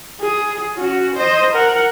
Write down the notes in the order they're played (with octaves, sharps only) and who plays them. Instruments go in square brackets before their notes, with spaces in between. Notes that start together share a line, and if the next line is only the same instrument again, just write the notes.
[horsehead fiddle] G#4
C#4 F#4
C5 D#5
A#4 F#5